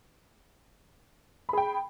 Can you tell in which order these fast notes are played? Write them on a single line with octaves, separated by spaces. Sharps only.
B5 G#4 G5